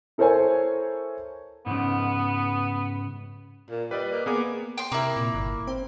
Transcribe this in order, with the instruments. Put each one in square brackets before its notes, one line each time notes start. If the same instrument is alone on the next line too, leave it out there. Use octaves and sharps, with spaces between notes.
[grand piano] E4 A4 A#4 C5 C#5 G#5
[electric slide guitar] G#2 C#3 [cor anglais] B3
[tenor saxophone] A#2
[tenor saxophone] G3 [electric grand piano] B4 D5 D#5
[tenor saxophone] A#3
[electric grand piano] A#3 B3 D6 [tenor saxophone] G#4
[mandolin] G5 C6
[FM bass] C3 [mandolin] A#3 E4
[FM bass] A#2
G1
C4